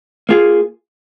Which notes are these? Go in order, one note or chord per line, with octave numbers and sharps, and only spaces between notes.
A#3 F4 G#4